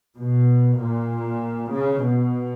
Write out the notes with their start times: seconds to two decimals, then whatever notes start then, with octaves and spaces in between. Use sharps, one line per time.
0.17 B2
0.80 A#2
1.72 C#3
2.03 B2